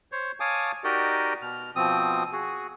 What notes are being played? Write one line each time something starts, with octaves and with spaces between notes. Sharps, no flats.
C5 C#5
C#5 F5 G#5 A5 D6 D#6
D#4 F#4 G4 A#4 D5 D#5
B2 F6
B2 F3 C4 D#6
F#4 G#4